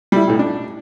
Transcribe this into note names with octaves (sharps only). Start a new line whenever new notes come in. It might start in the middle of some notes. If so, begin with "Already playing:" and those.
G3 E4
B1 A2
D4